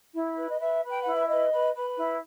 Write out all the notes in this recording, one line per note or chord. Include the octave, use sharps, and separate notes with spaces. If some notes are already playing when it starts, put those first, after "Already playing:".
E4
B4
D#5
B4 E5
B4
G5
E4 F#5
E5
B4 D#5
B4
B4
E4